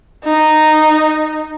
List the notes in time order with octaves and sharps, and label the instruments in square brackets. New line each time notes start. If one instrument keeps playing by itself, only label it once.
[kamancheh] D#4